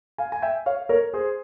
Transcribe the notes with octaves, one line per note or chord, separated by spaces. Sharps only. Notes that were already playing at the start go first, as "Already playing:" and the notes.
F5 G#5
G#5
E5 G5
C#5 F5
A#4 C#5
G#4 C5